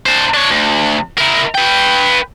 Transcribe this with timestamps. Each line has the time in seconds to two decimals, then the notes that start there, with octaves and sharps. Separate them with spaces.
0.06 D4 C5
0.34 D4 C#5
0.50 D2
1.18 E4 A#4
1.55 B4 G5